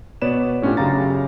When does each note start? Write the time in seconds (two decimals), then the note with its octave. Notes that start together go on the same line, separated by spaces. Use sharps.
0.22 B2 B3 B4 C#5 D5 E7
0.62 A2 C#4 D4 F4 G4
0.77 F#2 C#3 G4 F5 A#5 A6